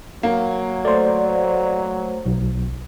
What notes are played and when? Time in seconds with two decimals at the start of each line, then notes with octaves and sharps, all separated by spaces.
0.23 F#3 A#3
0.85 A3 C5 D5
2.26 B1